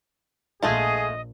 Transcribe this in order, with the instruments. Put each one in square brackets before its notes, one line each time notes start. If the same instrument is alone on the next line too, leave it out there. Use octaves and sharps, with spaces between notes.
[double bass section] A#1 [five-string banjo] G#3 A3 F4 [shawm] G#4 [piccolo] D#5